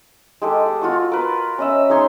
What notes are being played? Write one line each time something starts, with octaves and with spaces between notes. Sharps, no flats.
G#3 G4 A4
F#5
F4 F#4 C#6
A#4 B4
C#4 D#5 E5
G#3 D#4 C#5 C6